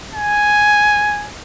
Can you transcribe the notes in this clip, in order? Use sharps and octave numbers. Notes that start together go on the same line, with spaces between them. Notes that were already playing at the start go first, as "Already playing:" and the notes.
G#5